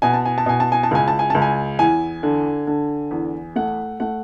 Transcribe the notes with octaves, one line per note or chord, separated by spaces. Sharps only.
B2 G#5
A5
G#5
A5
B2 G#5
A5
G#5
A5
C#2 G#5
A5
G#5
C#2 A5
G#5
E2 G#5
D3
D3
E2
A3 F#5
A3 F#5